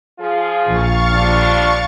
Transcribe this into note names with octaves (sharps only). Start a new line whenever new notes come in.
F3 F4 G#4
A#1 F5 C#6 A6
F3 G3 D4